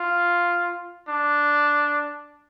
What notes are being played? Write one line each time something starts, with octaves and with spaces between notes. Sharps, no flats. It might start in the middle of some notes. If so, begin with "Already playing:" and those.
Already playing: F4
D4